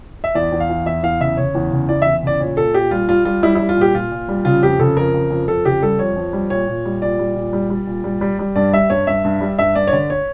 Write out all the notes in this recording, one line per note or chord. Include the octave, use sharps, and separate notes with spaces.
E5
E2 D5
E2
F5
E3
E2 E5
E2 F5
C#3 E5
C#3 C#5
E2
C#3
E3 D5
E2 E5
C#3 D5
A#2 C#5
A#2 A4
A#2 G4
G3 F4
G3 F4
G3 F4
G3 E4
G3 E4
F4
A#2 G4
A#2 F4
A#2
G3
C#3 F4
F2 G4
C#3 A4
F2 A#4
C#3
F2
F2 A4
C#3 G4
G3 A4
F2 C#5
F2
G3
A#2 C#5
A#2
G3
A#2 D5
G3
A#2
G3
G3
A#2
G3
G3
G3
G2 D5
G3 E5
G2 C#5
G2 E5
G2
G3
G2 E5
G2 D5
C#5
D3 D5
C#5